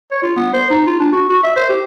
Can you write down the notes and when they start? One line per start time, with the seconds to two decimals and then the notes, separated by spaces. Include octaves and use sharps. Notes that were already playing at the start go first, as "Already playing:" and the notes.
0.11 C#5
0.23 F4
0.37 B3
0.54 C5
0.70 D#4
0.87 F4
1.00 D4
1.13 F#4
1.29 F#4
1.43 E5
1.56 C5
1.69 G4